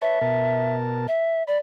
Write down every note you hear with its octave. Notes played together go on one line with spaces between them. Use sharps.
B4 C#5 E5 A5
B2 A#4 A5
E5
D5 B5